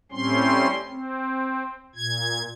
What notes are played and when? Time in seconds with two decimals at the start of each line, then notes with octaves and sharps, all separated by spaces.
0.12 A2 G3 C4 C#4 C6
0.89 C4
1.95 A#2 G#6